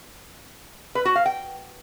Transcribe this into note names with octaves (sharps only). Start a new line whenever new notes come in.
B4
F#4
F5
G5